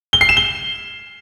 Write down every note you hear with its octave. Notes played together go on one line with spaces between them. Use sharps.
G7
C7
E7
G7